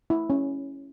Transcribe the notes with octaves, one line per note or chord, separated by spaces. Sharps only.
E4
C#4